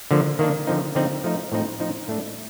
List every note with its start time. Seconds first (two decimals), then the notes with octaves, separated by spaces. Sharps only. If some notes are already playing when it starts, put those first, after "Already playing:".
0.11 D3 F3 A#3
0.39 D#3 A#3 D4
0.67 D3 F3 C4 D#4
0.95 D3 F3 C4 D#4
1.24 F3 A3 D#4
1.52 A2 F3 C4 D#4
1.79 F3 C4 D#4
2.08 A2 A3 D4